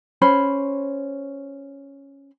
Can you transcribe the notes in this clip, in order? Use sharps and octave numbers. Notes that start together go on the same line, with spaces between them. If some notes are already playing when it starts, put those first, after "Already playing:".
C#4 C5 B5